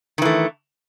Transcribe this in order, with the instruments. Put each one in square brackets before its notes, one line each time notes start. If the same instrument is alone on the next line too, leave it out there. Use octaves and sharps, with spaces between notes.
[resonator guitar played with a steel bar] D#3
E3
A3